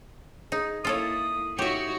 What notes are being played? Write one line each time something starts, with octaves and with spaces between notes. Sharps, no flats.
D#4 G#4
A#3 E4 F4 A4 C#5 D#6
D#4 F#4 G4 C#5 E5